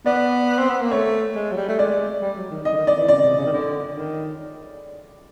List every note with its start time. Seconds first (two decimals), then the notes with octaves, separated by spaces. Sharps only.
0.06 B3 D5
0.59 C4
0.70 B3
0.81 A#3
0.91 A3 C#5
1.35 G#3
1.52 F#3
1.57 G3
1.69 A3
1.79 G#3 D5
2.21 G3
2.37 F#3
2.51 D#3
2.65 D#5
2.73 D3
2.76 D#3
2.87 D5
2.98 E3
3.08 C#3 D5
3.23 C3
3.37 C#3
3.46 D#3
3.52 D3
3.96 D#3